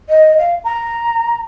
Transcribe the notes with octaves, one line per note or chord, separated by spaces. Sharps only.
D#5
F5
A#5